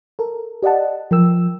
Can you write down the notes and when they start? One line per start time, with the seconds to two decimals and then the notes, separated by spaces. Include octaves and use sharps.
0.19 A4 A#4
0.63 G4 D5 D#5 F#5 A5
1.11 F3 A#4 G5 E6